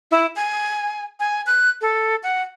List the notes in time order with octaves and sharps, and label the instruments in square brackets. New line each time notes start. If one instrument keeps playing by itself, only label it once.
[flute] E4
G#5
G#5
F#6
A4
F#5